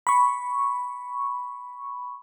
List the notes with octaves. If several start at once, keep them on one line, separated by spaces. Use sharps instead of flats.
B5 C#6